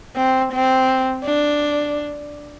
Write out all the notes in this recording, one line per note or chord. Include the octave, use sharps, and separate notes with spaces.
C4
C4
D4